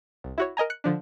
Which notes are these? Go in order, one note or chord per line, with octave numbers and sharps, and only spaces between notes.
C2
E4 F#4 C#5
A#4 D#5 G#5 A#5
F#6 C#7
D3 F3 D4